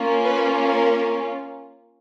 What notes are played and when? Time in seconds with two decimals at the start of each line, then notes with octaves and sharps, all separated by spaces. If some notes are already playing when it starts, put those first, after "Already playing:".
Already playing: A#3 C#4 F4
0.23 B4
0.69 A#4